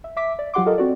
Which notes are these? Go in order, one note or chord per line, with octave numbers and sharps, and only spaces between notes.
E5
E5 D6 B6
D5
F#3 F4 G4 F#5 C6 D6
F4 G4 A4 A#4 D#5
C4 F#4 D5